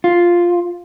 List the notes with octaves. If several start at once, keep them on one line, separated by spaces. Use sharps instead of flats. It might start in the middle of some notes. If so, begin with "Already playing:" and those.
F4